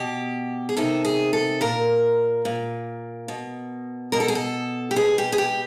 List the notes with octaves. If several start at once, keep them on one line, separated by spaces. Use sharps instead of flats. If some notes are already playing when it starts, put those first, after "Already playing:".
Already playing: B2 G4
G#4
C3 D#3 A4
G#4
A4
A#2 A#4
A#2
B2
B2 A#4
A4
G#4
A4
G4
B2 G#4
G4
G#4
G4